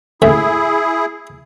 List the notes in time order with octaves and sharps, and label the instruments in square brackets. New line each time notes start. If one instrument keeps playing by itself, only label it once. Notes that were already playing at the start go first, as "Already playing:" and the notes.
[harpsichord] A1 D3 E5 [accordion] E4 G#4